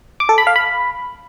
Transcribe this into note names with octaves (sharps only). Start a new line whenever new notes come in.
D6
A4
B5
F5
B5